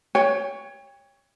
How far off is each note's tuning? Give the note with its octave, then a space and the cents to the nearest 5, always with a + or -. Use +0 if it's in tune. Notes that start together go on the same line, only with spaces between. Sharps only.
C#5 +10 G5 +35